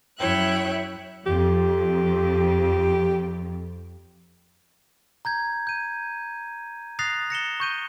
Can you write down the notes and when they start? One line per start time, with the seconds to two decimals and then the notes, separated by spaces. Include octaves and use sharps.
0.18 F#2 E4 C#5 E5 G5 F#6
1.26 F2 G4
5.25 A#5 G6 G#6
5.67 G6 D#7
6.99 D#6 F#6 A6 A#6 C7 F7
7.30 A#6 C#7 E7 G7
7.60 C#6 G6 D#7